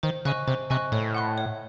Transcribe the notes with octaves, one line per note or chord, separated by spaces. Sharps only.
D#3 C5
C#3 D#5 G#5 C#6 F#6
C3 C5
C3 D#5 G#5 C#6 F#6
A2 C#5
F#5 C6 F#6
C#5